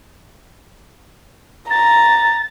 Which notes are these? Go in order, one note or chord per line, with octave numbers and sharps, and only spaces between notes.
A#5 A6